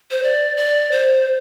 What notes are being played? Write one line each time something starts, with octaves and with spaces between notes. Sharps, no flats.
C5
D5
D5
C5